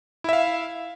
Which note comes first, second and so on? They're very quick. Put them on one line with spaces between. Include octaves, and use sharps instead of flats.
E4 E5 F5